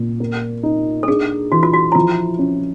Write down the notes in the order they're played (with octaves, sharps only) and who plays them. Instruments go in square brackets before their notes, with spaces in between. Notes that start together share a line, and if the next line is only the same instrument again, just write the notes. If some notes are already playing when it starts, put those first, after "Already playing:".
Already playing: [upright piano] A#2
A#3
D#4
[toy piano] A4
[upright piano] D4 [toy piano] G#4
[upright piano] E3 [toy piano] F#4
[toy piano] F4
F#4
E4
[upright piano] F3 [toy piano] F4
[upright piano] C#4